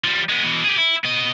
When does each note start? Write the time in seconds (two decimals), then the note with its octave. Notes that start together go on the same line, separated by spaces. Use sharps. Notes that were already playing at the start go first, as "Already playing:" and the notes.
0.04 F3 G3
0.29 G#3 B3
0.44 B2 E3
0.64 G4 G#4
0.78 E4
1.05 B3 D#5